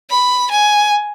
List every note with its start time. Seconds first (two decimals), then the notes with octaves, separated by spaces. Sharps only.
0.10 B5
0.51 G#5